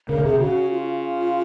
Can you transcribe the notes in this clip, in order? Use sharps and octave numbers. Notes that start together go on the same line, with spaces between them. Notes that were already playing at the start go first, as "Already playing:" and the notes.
C#3 A#4
C#3
C3 G#4
C#3 F#4
F4